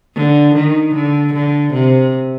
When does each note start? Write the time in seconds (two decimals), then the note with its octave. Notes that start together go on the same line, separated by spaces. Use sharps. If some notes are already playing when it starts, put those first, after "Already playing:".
0.16 D3
0.55 D#3
0.95 D3
1.34 D3
1.74 C3